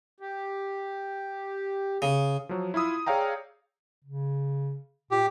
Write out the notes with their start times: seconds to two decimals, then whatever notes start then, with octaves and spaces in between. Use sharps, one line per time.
0.20 G4
2.02 C#3
2.49 F3 F#3
2.74 E4 F4 B5 D#6 E6
3.06 G#4 C#5 D5 F5 G5 A#5
4.04 C#3
5.11 A#2 G4